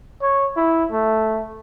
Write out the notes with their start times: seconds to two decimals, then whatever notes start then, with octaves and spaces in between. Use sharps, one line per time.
0.22 C#5
0.56 E4
0.92 A3